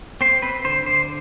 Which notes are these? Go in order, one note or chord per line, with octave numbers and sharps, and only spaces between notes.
C4 C5
C4 B4
D3 C5
D3 C5